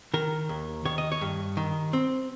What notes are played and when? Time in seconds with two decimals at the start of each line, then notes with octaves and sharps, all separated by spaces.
0.14 D#3 A#4
0.49 D#2
0.85 D#3 C#5
0.98 D#5
1.12 C#5
1.21 G2
1.57 D#3
1.93 C4